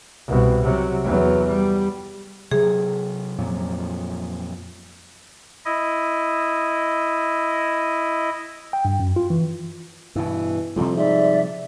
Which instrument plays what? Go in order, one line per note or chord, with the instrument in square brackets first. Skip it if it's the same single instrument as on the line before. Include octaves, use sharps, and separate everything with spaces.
[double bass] C2 B2
C3 F#3
E2 F#3
G3
[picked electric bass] C3 F#3 [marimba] G#4
[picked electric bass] F2 A#2 F#3
[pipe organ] E4 D#5
[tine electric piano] G5
G2
F#2
F4
E3
[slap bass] G2 B2 [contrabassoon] E3
[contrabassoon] F2 [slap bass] C3 F3 G3
[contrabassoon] G#2 [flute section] D5 E5